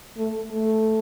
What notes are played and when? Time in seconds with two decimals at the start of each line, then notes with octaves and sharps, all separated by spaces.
0.17 A3
0.52 A3